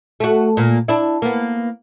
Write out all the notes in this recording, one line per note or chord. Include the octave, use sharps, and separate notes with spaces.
A3 F#4
A#2 A#3
D4 E4
A#3 B3